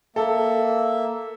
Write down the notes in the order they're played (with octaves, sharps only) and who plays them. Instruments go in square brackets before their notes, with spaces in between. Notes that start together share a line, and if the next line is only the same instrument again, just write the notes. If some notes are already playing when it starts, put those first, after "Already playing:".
[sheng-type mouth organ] A#3 E5 [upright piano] A4